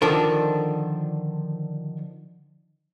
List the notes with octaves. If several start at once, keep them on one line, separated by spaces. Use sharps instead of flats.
D3 D#3 F3 D4 A4 A#4